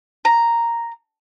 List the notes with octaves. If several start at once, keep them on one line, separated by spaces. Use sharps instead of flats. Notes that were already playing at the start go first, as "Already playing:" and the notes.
A#5